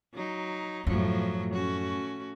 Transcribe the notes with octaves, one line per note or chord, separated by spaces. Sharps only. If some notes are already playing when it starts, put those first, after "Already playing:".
F#3 D#4
F#2 A2 F3 F#3
A3 C#4 F#4